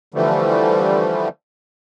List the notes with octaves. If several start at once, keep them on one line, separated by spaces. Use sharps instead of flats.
D3 E3 F3 G3 A3